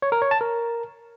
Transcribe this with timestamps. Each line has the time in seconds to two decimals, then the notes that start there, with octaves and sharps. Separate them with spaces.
0.02 C#5
0.12 A#4
0.22 C#5
0.31 A5
0.41 A#4